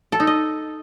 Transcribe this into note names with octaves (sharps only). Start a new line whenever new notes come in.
A4
D#4
D#5